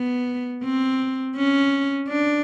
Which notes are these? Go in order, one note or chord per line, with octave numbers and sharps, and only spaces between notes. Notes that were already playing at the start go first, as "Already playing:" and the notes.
Already playing: B3
C4
C#4
D4